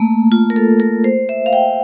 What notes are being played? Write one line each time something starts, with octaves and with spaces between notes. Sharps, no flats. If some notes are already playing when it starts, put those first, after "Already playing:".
Already playing: A3 A#3
F4
A#4
A4
A#4
C5
E5
F5
G5